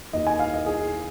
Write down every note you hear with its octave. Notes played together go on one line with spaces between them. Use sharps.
D#2 D#3 D#5
G#5
F5
D#5
G#4